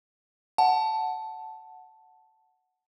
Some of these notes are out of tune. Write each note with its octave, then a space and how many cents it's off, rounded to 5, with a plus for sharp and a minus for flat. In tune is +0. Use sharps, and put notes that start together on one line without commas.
F#5 +0 A5 +0